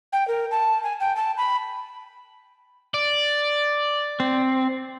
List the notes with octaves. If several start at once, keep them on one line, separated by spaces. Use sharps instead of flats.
G5
A#4
A5
G#5
G5
A5
B5
D5
C4